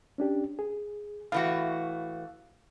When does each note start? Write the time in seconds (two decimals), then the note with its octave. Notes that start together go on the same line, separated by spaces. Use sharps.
0.18 C#4 D4 G4
0.59 G#4
1.32 A2 E3 F#4 F5